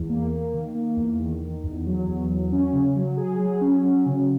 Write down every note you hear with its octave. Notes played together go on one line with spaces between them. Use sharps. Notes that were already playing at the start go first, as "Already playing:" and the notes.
Already playing: E2
A#3
A#3
D#3
A#3
E2
D#3
D#3
E2
F#3
E2
F#3
C#4
C#3
F#3
G#4
F#3
C#4
F#3
C#3